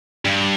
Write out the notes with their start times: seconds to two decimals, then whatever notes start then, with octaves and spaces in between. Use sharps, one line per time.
0.25 G2